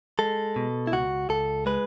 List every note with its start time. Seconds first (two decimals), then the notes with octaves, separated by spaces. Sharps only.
0.19 G#3 A4
0.56 B2
0.87 E4
0.92 C#2 F#4
1.29 C#2 A4
1.66 G#3 B4